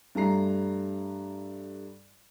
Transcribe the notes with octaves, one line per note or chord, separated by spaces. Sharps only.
G2 A3 A#5 C7